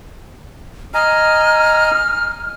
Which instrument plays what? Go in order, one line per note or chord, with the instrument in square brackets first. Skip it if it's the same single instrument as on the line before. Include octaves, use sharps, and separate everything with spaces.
[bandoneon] D#5 G#5 A#5 [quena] F6